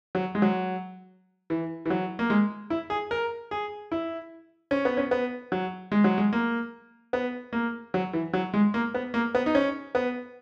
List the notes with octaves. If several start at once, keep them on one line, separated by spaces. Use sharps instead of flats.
F#3
G#3
F#3
E3
E3
F#3
A#3
G#3
E4
G#4
A#4
G#4
E4
C#4
B3
C#4
B3
F#3
G#3
F#3
G#3
A#3
B3
A#3
F#3
E3
F#3
G#3
A#3
B3
A#3
B3
D#4
C#4
B3